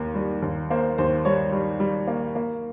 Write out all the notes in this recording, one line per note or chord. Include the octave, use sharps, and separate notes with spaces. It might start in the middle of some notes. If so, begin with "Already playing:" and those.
Already playing: D#2 A#3
G3
D#2
A#3 C5
D#2 C5
G3 C#5
G3
G3
A#3
A#3